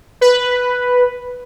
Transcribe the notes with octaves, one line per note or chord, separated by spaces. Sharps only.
B4